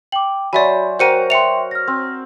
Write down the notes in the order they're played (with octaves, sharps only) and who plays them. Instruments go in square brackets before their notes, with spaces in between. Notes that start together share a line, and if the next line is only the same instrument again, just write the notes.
[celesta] G5 D6 [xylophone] F#7
[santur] F#3 C5 [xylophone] D5 E5 G#5 [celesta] B5
[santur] F#4 A#4 A#5 [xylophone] C5 C#7 D#7 [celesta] G5
[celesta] E5 G5 C6 [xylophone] C#7 F7
[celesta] F6 A#6
[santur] C4